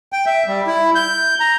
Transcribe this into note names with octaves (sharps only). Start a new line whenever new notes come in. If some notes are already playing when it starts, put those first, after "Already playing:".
G5
E5
G3
E4
G6
A#5